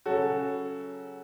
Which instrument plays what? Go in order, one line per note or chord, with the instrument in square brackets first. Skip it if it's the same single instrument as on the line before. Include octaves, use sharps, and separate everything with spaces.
[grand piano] C#3 F#3 C#4 F#4 A4